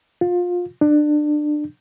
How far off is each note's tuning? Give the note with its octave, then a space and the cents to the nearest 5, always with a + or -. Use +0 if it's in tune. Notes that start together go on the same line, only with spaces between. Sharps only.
F4 +25
D4 +25